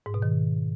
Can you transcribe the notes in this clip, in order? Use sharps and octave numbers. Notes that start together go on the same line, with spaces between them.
G#2
B2
D#3